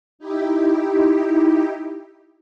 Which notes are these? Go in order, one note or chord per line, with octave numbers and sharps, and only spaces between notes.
D#4 E4 G4